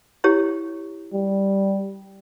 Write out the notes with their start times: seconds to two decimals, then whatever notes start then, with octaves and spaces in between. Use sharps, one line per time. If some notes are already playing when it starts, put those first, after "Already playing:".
0.24 E4 G4 C#5
1.13 G3